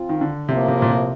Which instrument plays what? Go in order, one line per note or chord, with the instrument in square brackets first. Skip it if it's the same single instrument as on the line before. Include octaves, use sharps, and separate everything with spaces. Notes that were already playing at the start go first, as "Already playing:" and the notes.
Already playing: [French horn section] F3 C4 F4
[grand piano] D#3
D3
[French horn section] A2 F3 A#3 [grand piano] C3
[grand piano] C3
A#2
C3